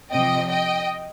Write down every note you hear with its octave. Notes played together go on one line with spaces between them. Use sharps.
C3 F3 D#5 G5
D#5 G5